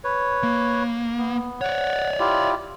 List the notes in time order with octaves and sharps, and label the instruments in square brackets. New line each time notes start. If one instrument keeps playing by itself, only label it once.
[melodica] B4 C#5
[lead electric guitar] A#3
[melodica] B3
[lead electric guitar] C#5 D5 [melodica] F#5
[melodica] E4 F4 G4